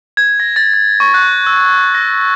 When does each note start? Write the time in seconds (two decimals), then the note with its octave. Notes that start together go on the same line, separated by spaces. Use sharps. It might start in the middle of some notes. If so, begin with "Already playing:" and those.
0.17 G#6
0.40 A#6
0.56 A6
0.74 A6
1.00 C#6
1.14 F#6
1.47 E6
1.95 A#6